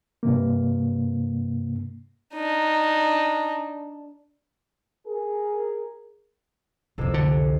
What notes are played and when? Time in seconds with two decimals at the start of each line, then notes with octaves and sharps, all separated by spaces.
0.23 G2 C3 A#3
2.35 D4 D#4
5.07 G#4 A#4
6.98 F#1 C2 F2 C3 A4
7.14 D3